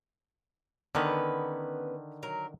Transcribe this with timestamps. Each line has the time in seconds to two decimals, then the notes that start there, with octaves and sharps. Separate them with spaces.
0.95 D3 D#3 B3 C#4 B4
2.23 F#3 A#4